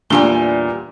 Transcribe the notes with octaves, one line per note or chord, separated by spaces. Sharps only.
E2 A#2 G3 D4 G#5 G7